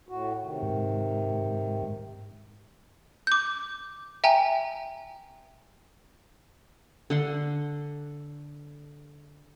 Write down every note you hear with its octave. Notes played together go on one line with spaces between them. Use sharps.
A2 F#4
C3 D#3
G#2
D6 G6
E5 G5 G#5 A#5
D3 F#5 C6